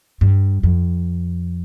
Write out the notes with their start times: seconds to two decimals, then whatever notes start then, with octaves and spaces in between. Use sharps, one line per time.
0.21 G2
0.63 F2